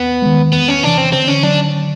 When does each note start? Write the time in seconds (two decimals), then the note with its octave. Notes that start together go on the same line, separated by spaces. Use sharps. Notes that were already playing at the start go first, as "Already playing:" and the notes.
Already playing: D#2 B3
0.22 D#3 G#3
0.53 E2 B3
0.68 C#4
0.83 C3 E3 D4
0.98 C4
1.13 D3 C4
1.28 C#4
1.43 F#3 D4